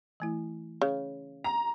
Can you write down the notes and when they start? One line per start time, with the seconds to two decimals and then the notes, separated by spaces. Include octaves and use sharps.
0.20 E3 A3 E4
0.81 C#3
1.44 A#5